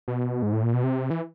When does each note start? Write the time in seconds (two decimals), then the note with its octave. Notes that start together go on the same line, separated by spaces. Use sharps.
0.08 B2
0.42 G#2
0.53 A2
0.63 A#2
0.74 B2
0.84 C3
1.10 E3